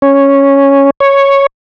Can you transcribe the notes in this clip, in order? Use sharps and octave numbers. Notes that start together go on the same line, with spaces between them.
C#4
C#5